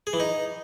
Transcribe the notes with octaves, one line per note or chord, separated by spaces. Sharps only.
G#4
E3
D#4